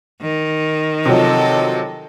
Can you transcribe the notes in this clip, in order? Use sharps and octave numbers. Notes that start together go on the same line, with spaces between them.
D#3
C3 F3 F#3 A4 D#5